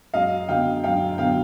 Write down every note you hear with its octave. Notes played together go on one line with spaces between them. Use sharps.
F#2 D#5 F5
D3 F#3 B3 F5 G5
F#2 F5 G5
D3 F#3 B3 F5 G5